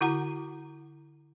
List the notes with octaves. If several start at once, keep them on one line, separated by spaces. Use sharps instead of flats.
D3 E4 F#4 F#5 A#5